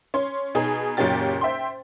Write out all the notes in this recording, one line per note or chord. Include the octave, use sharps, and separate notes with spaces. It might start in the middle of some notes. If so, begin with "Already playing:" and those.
C#4 C6
B2 D#4 G#4
F#1 A#2 F#3 C#4 G4 A6
C5 E5 G5 C6